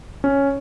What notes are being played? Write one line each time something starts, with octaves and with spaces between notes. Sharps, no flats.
C#4